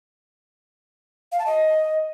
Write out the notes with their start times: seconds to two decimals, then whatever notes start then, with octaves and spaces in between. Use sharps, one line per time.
1.32 F5
1.39 A5
1.46 D#5